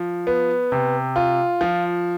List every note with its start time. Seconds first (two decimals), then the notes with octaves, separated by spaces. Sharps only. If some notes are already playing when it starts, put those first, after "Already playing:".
Already playing: F3
0.27 B3
0.72 C3
1.16 F4
1.61 F3